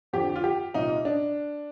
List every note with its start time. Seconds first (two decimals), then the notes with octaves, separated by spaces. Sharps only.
0.13 F2 D3 G4
0.36 F4
0.44 G4
0.74 C2 A#2 D#4
1.05 D4